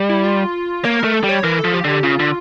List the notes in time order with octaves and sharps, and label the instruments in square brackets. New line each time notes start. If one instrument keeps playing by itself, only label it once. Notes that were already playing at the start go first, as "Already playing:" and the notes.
Already playing: [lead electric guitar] G3
[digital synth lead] E4
F4
[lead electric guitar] A#3 [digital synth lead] C#5
[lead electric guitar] A3 [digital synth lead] A#4
[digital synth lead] A4
[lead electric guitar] G3
[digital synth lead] C#5
[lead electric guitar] E3 [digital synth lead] A#4
[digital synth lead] A4
[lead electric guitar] F3
[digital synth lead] G4
[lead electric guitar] D3 [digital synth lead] G4
[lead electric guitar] C#3 [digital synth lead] F4
[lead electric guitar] D3